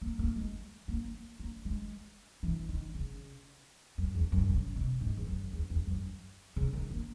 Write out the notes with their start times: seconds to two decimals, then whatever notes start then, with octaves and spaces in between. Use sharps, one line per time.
0.02 A#3
0.19 A#3
0.36 G#3
0.88 A#3
1.40 A#3
1.65 G#3
2.43 E3
2.69 D#3
2.95 C#3
3.98 F#2
4.15 E2
4.32 F#2
4.50 C#3
4.76 B2
5.01 G#2
5.17 E2
5.27 F#2
5.53 E2
5.70 E2
5.87 F#2
6.56 C#3
6.73 D#3
6.91 A#3